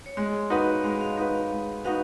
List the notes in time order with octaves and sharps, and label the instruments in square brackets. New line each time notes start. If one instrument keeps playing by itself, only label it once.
[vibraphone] C#5
[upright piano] G#3 [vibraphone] D#5
[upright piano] D#4 F#4 B4 [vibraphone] F5
[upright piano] G#3 [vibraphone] F5
[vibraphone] F5
[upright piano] D#4 F#4 B4 [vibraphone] F5
[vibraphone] F5
[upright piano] G#3
[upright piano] D#4 F#4 B4 [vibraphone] F5